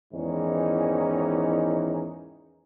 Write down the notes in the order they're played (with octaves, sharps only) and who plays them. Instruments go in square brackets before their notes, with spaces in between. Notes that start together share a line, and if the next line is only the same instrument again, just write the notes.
[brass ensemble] E2 G#2 D#3 E3 C#4 D#4